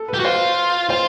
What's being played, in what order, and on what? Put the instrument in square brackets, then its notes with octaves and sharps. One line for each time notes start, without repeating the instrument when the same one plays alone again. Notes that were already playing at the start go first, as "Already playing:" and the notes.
Already playing: [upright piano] A4
B4
[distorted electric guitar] G4
F#4
[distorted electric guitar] F4 [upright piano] C5
[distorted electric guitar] F4 [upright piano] C5